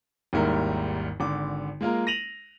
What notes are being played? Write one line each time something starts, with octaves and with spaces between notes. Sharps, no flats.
G#1 D#2 G#2 G3 E4 A#4
G#1 D3 D6
G#3 A#3 F4 A#4
A#6 D#7 F7 F#7